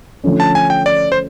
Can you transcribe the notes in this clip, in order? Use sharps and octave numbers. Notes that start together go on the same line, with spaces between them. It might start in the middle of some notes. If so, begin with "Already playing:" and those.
D3 F3 A3 C#4
A5
G#5
G5
D5
C5